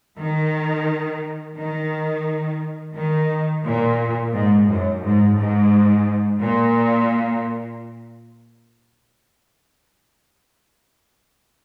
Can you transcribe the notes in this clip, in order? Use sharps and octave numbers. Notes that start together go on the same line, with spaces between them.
D#3
D#3
D#3
A#2
G#2
F#2
G#2
G#2
A#2